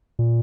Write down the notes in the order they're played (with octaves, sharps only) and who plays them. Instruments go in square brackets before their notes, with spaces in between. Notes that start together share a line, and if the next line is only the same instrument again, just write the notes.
[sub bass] A#2